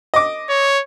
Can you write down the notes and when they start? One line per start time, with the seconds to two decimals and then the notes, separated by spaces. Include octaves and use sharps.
0.14 D#5 D6
0.49 C#5